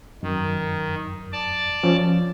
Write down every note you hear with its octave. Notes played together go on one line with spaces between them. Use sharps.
F#2 D#3
D5 A5
F3 C#4